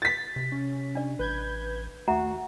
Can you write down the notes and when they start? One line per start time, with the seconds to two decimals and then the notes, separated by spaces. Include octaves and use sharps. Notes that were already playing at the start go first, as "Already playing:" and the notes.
0.02 F#4 A6 B6
0.36 C3
0.52 C#4
0.95 D4 D5
1.19 A1 B4 G6 G#6
2.08 D#2 A3 F#4 E5 F#5 A#5